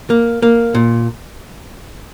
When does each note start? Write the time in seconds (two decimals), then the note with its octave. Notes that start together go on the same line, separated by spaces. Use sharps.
0.10 A#3
0.42 A#3
0.75 A#2